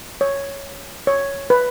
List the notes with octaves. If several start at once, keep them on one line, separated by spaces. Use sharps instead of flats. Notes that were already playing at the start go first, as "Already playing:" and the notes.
C#5
C#5
B4